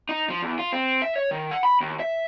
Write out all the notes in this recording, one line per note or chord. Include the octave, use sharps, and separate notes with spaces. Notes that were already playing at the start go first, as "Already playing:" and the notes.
D#4
F3
E2
F4
C4
E5
C#5
D#3
F#5
B5
D#2
E5